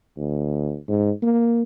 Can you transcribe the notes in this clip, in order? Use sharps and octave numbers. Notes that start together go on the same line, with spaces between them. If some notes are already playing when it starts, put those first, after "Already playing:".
D2
G#2
A#3